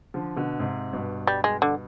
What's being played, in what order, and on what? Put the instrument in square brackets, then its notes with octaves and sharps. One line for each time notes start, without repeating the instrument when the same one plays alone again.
[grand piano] D3 F3
B2 D3
G#2 C3
G2 B2
[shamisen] G3
G#3
D3